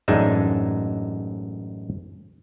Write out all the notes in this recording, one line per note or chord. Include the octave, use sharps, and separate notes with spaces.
A1 F#2 G#3 D4 D#4 E5